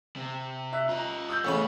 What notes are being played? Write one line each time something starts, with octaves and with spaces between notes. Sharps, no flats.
C3
E5 F#6
F4 D#5 A#5
D#6 E6 G6
A1 C#3 B3 C4 B5